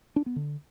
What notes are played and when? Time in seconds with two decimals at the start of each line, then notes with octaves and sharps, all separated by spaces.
0.16 D4
0.26 B3
0.36 D3